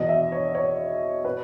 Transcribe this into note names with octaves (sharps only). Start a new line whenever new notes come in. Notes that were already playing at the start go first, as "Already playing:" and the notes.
Already playing: E2 B2 D#5
E5
C#5
C#5
B2 B4